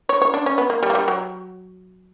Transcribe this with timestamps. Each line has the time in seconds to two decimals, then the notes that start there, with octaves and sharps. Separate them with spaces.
0.09 C#5
0.22 C#5
0.34 D4
0.46 C#4
0.58 B3
0.70 A#3
0.83 G3
0.90 A#3
0.95 G3
1.08 F#3